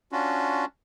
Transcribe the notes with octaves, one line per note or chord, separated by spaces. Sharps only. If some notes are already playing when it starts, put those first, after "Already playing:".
C#4 D4 F4 F#4